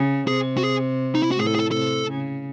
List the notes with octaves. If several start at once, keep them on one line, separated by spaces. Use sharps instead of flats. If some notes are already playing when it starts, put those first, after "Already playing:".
Already playing: C#3
C3 G#4
F#4
G#4
D#4
E4
F#4
A2 G#4
A4
G#4
A4
C3 A4
C#3